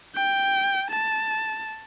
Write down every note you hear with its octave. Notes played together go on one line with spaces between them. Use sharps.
G5
A5